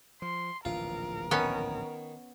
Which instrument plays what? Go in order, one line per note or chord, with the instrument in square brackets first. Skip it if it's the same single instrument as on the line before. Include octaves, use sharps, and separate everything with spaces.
[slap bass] F3 [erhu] C6
[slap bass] D1 A#1 E3 [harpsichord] F4 [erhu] A#4
[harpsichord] D#3 [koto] B3 C#4